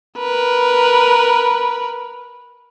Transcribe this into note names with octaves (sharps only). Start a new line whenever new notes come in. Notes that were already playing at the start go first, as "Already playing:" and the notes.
A#4 B4